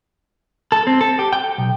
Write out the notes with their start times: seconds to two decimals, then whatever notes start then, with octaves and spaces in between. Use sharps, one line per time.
0.72 A4
0.87 C4
1.01 A4
1.19 G4
1.33 G5
1.58 B1